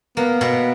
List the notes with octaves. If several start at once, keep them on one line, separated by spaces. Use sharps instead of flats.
A#3 B3
B2